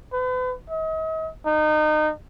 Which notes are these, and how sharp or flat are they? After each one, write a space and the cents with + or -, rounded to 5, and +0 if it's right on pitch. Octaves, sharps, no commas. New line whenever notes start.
B4 +40
D#5 +40
D#4 -25